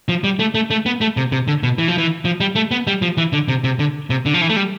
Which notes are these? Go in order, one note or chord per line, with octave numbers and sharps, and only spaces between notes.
F3
G3
A3
A3
A3
B3
A3
C3
C3
D3
B2
E3
F3
E3
F3
G3
A3
B3
G3
F3
E3
D3
C3
C3
D3
C3
D3
F3
E3
A3
G3